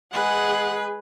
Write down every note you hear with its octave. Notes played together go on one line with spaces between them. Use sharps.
G#3 G#4 B4 F#5